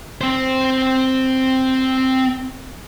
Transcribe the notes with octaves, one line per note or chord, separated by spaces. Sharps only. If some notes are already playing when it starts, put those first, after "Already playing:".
C4 C5